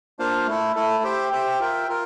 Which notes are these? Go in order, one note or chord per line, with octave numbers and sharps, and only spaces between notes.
A#3 D4 F4 C5 F5
A3 E4 A4
A3 E4 A4
G4 C5 E5 G5
G4 C5 E5 G5
F4 A#4 E5 G5
F4 A#4